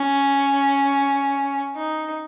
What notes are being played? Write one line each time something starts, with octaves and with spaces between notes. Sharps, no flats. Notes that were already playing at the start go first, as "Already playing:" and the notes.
Already playing: C#4
D#4